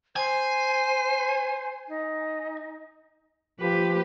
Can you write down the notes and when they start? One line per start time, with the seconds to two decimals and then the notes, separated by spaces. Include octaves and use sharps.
0.16 C5 G#5
1.88 D#4
3.60 F3 G4 B4